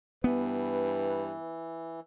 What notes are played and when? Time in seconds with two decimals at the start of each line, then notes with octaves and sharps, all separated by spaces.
0.24 G2 E3 B3 B4